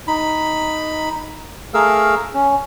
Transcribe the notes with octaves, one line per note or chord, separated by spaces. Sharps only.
D#4 B5
A3 G#4 A#4 F5 E6
C#4